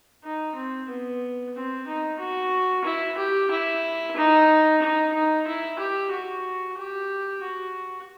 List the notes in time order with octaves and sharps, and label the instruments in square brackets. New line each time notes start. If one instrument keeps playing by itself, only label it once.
[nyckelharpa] D#4
C4
B3
C4
D#4
F#4
E4
G4
E4
D#4
D#4
D#4
E4
G4
F#4
G4
F#4